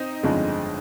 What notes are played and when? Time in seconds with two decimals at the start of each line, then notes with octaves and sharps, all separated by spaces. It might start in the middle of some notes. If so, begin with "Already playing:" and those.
Already playing: C4 D#4
0.23 G1 F2 D3 F3 G#3